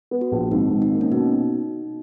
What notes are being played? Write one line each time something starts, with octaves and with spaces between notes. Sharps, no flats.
B3
F#4
A#1
G#1 D#4
G#1
D#4
A#3
C#4
B2 D#4